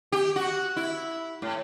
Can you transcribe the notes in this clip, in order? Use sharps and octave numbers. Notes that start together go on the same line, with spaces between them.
G4
F#4
E4
A2